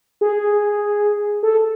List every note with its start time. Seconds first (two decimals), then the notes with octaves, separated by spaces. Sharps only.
0.21 G#4
1.43 A4